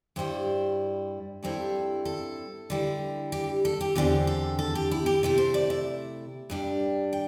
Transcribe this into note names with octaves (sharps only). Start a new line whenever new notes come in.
G2 G3 E4 C5
G2 G3 C4 E4 A4
A4
D3 G3 E4
G4
A4
G4
E2 D3 C4 G4
A4
A4
G4
E4
G4
C3 A3 E4
C5
D5
E5
G2 G3 D4
G5